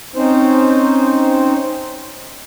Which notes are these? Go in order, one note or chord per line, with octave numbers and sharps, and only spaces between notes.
C4 C#4 D#4 C5